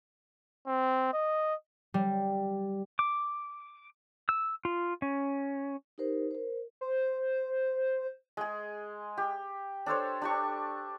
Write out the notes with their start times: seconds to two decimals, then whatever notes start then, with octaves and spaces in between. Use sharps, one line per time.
0.67 C4
1.13 D#5
1.94 G3
2.99 D6
4.29 E6
4.65 F4
5.02 C#4
5.98 D#4 G4 A#4 C5
6.31 A#4 C5
6.81 C5
8.37 G#3 G#4
9.17 G4
9.86 D4 A4 C5 C#5
10.22 D4 G4 C#6